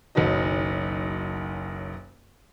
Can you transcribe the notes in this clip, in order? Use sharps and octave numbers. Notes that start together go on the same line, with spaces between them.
F#1 B1 D#3 F#3 D#5